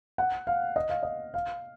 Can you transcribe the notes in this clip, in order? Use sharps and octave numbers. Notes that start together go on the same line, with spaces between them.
F#5
F5
D#5
F5
D#5
F5